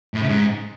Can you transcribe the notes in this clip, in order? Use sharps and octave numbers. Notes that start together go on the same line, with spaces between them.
A2
C#3
G#2